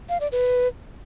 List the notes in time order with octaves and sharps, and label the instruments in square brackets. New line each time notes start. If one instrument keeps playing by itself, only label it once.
[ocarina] F5
D5
B4